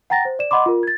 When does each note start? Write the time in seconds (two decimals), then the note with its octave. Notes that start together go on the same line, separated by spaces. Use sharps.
0.10 F#5 G5 A#5 A6 A#6
0.25 C5
0.39 D5 E7
0.51 D#5 F#5 B5 C6 D6
0.66 F4 A#4
0.83 G#6 A6